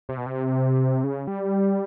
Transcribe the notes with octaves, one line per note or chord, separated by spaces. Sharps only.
C3
B2
C3
C#3
G3